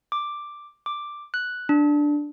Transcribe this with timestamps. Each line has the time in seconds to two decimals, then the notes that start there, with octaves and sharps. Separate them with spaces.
0.12 D6
0.86 D6
1.34 F#6
1.69 D4